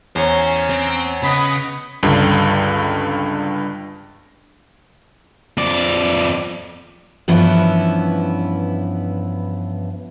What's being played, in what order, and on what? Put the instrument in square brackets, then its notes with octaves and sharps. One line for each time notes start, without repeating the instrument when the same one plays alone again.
[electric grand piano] E2 C#5 [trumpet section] C#4 A#5 [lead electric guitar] C5
[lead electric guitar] C4
[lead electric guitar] C#3 [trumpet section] B3 D#5 [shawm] B5
[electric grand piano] C#2 G2 D3
[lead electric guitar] F2 D5
[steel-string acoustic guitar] G2 E3 F3 B3 C#4 E4